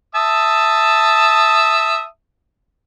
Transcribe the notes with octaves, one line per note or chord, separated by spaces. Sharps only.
E5 A5 D#6